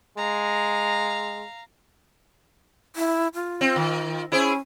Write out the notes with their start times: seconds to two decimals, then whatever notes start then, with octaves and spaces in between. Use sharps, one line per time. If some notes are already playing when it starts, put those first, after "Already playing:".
0.18 G#3 F5 A#5
2.96 E4
3.34 F4
3.61 C4
3.76 D#3
4.32 C#4 E4 G#4 C5